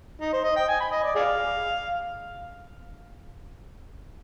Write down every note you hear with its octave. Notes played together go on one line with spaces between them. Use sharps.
D#4
C5
D#5
G5
G#5
B5
D#5
D5
G#4 D5 F5